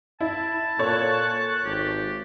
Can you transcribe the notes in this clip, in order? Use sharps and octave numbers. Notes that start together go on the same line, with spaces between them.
E4 A5
A#2 A4 C#5 C#6 F#6 A6
G#1 G4